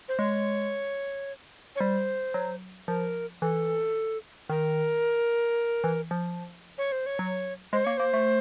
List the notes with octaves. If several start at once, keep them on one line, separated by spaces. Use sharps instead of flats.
C5
G#3 C#5
C#5
G3 C5
F#3
F3 A#4
E3 A4
D#3 A#4
E3
F3
C#5
C5
C#5
F#3
G#3 C5
A#3 C#5
A#3 C5
A3